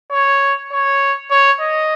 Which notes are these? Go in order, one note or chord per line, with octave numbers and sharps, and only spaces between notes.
C#5
C#5
C#5
D#5